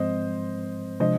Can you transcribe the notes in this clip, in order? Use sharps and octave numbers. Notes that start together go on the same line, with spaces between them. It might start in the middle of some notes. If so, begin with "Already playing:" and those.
Already playing: G#2 F3 G#3 C4 C5 D#5
C3 F3 G#3 D4 C5 D#5